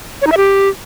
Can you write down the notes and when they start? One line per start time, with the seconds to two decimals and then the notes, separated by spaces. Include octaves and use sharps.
0.22 C#5
0.27 D#4
0.32 E5
0.37 G4